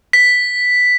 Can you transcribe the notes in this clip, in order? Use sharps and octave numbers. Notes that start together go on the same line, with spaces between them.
B6